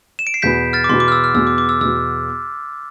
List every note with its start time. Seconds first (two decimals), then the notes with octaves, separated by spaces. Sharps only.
0.19 E7
0.27 D7
0.34 C7
0.42 E2 B2 B3 G6 B6
0.73 F6 A6
0.84 D6
0.89 E2 B2 B3 C6
1.00 D6
1.08 F6
1.12 E6
1.24 F6
1.34 E2 B2 B3 E6
1.47 D6
1.58 D6
1.69 E6
1.81 E2 B2 B3 E6